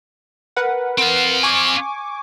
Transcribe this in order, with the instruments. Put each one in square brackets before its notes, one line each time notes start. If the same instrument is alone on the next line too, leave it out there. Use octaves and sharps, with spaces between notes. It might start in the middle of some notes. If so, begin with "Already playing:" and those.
[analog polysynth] A#4 B4 F#5
[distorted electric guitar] C4 F5
[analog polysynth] G#5 C#6 D6